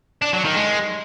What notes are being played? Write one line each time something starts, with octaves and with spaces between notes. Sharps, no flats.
D4
F#3
D#3
G#3